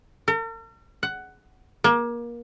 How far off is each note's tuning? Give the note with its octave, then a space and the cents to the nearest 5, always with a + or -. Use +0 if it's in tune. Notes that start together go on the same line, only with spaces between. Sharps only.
A#4 -45
F#5 +10
A#3 +25